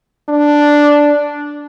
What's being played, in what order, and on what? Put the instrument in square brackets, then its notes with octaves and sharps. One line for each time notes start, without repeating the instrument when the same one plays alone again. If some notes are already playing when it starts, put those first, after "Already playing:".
[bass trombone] D4